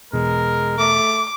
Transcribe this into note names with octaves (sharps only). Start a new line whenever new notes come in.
E2 B2 G#3 A#4
A3 D6